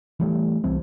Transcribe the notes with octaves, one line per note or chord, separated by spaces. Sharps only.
E3 G3 A3
C2 E3 G3 C4